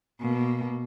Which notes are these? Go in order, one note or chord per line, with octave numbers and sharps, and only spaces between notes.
B2 A#3